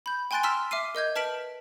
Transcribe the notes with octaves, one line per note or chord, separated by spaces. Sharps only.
B5 G6
G5 G#5 C6 F#6 A6 D7
A#5 C6 E6 F6 B6 E7
E5 D6 F6 C7 D#7
A#4 D#5 G6 G#6
B4 A5 F6 B6 D7 F#7